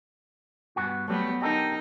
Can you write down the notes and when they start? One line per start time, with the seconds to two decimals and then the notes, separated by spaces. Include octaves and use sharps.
0.76 G2 B3 F#4
1.08 F#3 G3 A3 B3
1.42 D#4 G4 A4 A#4